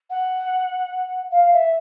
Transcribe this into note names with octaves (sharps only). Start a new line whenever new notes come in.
F#5
F5
E5